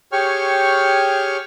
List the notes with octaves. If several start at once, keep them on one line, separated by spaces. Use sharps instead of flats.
G4 G#4 C#5 G5 C#6 F6